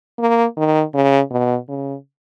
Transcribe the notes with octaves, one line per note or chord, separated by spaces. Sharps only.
A#3
D#3
C#3
B2
C#3